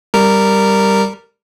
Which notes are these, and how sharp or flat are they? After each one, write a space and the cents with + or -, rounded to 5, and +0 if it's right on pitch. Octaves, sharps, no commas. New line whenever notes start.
G3 +0 A#4 -10